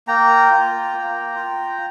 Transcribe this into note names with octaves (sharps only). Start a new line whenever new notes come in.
A#3 G5 A#5
F4
A#3
F4